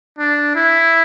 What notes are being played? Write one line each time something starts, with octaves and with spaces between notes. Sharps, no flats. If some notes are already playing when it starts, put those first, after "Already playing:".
D4
E4